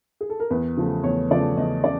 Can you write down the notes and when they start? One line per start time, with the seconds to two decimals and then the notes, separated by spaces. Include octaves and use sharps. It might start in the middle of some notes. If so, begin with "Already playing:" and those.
0.21 G#4
0.30 A4
0.40 A#4
0.50 E2 B4
0.77 C#3 F3 A3
1.03 E2 C#5
1.31 C#3 F3 A3 D5
1.57 E2 D#5
1.84 C#3 D5